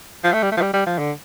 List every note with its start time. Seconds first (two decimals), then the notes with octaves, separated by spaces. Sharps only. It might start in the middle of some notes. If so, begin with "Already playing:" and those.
0.24 F3
0.33 A3
0.43 G3
0.52 A3
0.57 F3
0.61 G3
0.73 G3
0.86 F3
0.98 D3